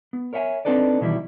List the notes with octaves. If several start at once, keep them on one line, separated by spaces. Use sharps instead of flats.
B3
A#4 C#5 E5 F#5 G#5
C4 D4 D#4 A4 B4 D5
B2 D#3 E3 F#3 G3 E4